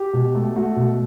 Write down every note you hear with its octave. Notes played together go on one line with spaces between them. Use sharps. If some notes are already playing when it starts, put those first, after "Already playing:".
Already playing: G4
B2
A3
A3 F#4
B2